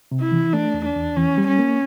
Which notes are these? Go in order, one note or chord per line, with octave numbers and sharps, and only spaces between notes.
C3
E4
E3
A3 D4
E2
D4
E2
E3 C#4
G3
C#4
A#3